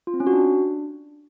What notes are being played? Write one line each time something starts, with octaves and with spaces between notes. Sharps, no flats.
F4
C4
C#4
F#4
D4